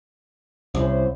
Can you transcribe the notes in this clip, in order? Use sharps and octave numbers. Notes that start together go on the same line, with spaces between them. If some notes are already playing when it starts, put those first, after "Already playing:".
C2 C#4 E4 C5